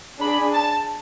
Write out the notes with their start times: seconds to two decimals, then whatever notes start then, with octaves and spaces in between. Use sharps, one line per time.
0.21 D4 G#4 B5
0.54 A5